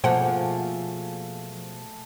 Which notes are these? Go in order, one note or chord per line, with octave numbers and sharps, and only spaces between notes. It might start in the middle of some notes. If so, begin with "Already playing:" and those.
B2 F3 A3 A#3 G#4 C5 F#5